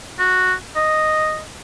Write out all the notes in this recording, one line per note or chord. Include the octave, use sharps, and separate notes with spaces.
F#4
D#5